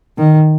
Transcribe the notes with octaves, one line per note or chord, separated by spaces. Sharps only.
D#3